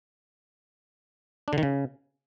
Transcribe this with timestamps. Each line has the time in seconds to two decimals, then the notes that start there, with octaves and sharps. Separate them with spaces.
1.48 D4
1.53 D3
1.58 D#3
1.63 C#3